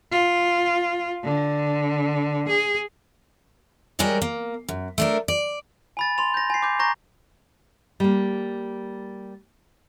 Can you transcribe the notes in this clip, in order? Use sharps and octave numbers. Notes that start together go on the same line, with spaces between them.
F4
D3
G#4
G3 G#3 G4 A#4 C#5
A#3
F#2
A3 D4 A#4
D5
G#5 B5 A6
C6 F7
G6 A#6
G#5 C7
D6 G6
A#5 C#6 G6 A#6
G3 A#3